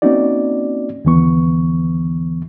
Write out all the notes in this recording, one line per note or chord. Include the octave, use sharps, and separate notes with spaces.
A#3 C4 C#4 D#4 F#4 D5
D#2 D3 E3 B3 C#6